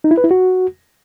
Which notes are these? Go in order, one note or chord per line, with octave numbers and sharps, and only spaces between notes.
D#4
E4
B4
E4
F#4